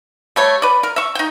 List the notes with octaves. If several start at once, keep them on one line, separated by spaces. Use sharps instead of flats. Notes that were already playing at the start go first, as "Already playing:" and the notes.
G3 A3 C#5
B4 D5
A#4
E5 C#6
D#4 G5